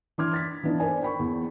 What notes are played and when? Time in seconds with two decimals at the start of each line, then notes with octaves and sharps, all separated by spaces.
0.18 E3 D4 C6 D6 F6 G#6
0.33 A6 B6
0.63 E3 B3 D4 D#4
0.80 A#4 C5 D5 G#5
1.02 G5 B5 C#6
1.19 E2